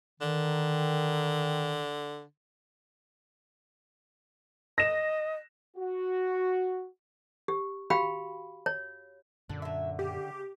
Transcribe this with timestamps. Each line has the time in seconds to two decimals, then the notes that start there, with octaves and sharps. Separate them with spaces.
0.21 D3 D#3
4.78 D#5 A#6 E7
5.77 F#4
7.48 G4
7.90 F#4 G4 F5 G5 B5
8.66 C#5
9.50 F#2 A#2 D3 D4
9.62 F#3 E5
9.99 C#3 G4